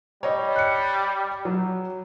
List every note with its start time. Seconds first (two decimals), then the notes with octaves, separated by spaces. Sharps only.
0.23 G3 C#5 D#5
0.56 F#6 C#7
1.45 F#3